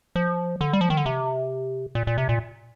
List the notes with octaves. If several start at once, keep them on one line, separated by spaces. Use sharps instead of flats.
F3
D3
G3
F3
D#3
D3
C3
A#2
A#2
C3
A#2